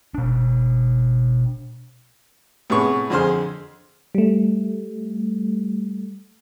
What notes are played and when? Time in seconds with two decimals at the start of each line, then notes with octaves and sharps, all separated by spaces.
0.14 B2 D4
2.70 A2 C3 B3 G#4 C#6
3.10 F2 D3 G#4 C5 C6 F6
4.15 G3 A3